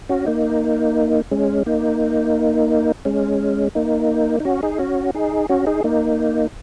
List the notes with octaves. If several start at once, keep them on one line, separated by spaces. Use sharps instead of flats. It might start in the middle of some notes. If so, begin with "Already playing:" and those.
C#4 F#4
A#3 D#4
G#3 C#4
A#3 D#4
G#3 C#4
A#3 D#4
D#4
C#4 F#4
D#4 G#4
C#4 F#4
D#4 G#4
C#4 F#4
D#4 G#4
A#3 D#4